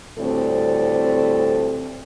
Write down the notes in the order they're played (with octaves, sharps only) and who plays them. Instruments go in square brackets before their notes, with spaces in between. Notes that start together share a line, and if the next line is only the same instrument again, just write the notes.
[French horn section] D2 A2 G3 C4 A4